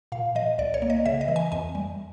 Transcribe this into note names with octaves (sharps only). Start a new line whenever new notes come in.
A#2 F5
F3 D#5
C2 D5
C#5
A#3
D#5
C#3 E5
D#5
E3
G#5
F2 G#5
G3